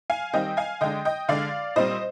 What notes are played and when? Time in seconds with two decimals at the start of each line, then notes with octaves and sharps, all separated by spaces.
0.10 F5 G#5
0.33 D#3 G3 C4 D#5 G5
0.57 F5 G#5
0.81 D3 G#3 D4 D#5 G5
1.05 D#5 G5
1.28 D3 G#3 D4 D5 F5
1.76 A#2 G3 C4 C5 D#5